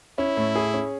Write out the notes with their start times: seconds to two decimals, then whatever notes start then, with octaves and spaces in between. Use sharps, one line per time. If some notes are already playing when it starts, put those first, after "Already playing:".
0.18 C#4 E4
0.37 A2
0.55 G#4
0.74 C#4